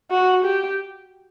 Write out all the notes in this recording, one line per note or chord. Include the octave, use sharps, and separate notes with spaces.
F#4
G4